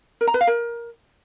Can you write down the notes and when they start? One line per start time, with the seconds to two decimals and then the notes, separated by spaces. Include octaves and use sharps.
0.21 A#4
0.27 A#5
0.34 B4
0.41 F5
0.47 A#4